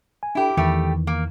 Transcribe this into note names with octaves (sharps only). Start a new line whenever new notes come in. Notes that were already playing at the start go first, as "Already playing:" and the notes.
G#5
D4 E4 G4 A4
E2 D#3 E3 G3 A3 G4
A#3